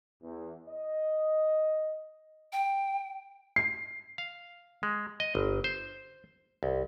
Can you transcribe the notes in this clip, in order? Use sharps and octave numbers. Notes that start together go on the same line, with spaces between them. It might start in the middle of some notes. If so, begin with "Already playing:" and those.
E2
D#5
G5
C7
F5
G#3
D#5
G1
C5
C2